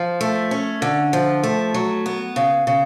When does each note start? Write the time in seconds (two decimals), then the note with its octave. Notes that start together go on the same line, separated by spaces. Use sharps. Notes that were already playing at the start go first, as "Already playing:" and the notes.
Already playing: F3
0.21 A3
0.51 C#4
0.82 D3
1.13 F3
1.43 A3
1.74 F#3
2.06 B3
2.36 C#3
2.67 C#3